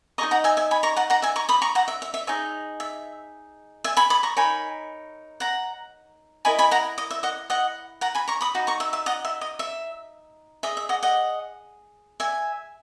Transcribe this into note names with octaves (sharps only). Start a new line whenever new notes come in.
D#4 G#4 D#5 A#5 C#6
F#5 A#5
E5 G#5
E5 G#5
G#5 B5
A#5 C#6
F#5 A#5
F#5 A#5
E5 G#5
A#5 C#6
B5 D#6
A#5 C#6
F#5 A#5
E5
E5
E5
D#4 G#4 C#5 E5
E5
E5 G#5
G#5 B5
B5 D#6
A#5 C#6
D#4 A#4 C#5 G#5 B5
F#5 A#5
E4 A#4 D#5 G#5 B5
G#5 B5
F#5 A#5
D#5
E5
D#5 F#5
D#5 F#5
F#5 A#5
G#5 B5
A#5 C#6
B5 D#6
D#4 F#4
A#5 C#6
E5
E5
D#5 F#5
E5
D#5
E5
G#4 D#5 E5
E5
D#5 F#5
D#5 F#5
E5 G#5